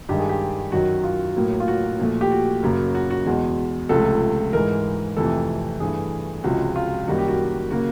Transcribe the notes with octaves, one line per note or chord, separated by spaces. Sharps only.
G2 D#3 G#3 G4
G#4
G4
F#2 D#3 F#3 F#4
F4
A2 F#3 A#3
F4
F#4
A#2 F3 A3
G4
F#4
F#2 C#3 F#3 A#3
F#4
F#4
E2 B2 G#3
C#2 C3 F3 A3 A4
G#2 E3 G#3 A#4
F2 C3 E3 A3 A4
G2 E3 A3 G#4
C#2 C3 F3 G#3 F#4
F4
F#2 D#3 G3 A#3 F#4
G4
F#4
C#3 F#3 A#3 F#4